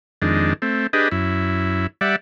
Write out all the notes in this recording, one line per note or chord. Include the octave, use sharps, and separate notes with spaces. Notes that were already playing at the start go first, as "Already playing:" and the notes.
F2 D#3 G#3 D4
A3 C4
D4 G4 G#4 B4 D#5
F#2 E4
G3 D5 E5 F#5